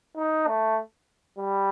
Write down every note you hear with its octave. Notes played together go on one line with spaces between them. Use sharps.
D#4
A3
G3